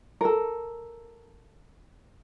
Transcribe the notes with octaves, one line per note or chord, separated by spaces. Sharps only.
A4 A#4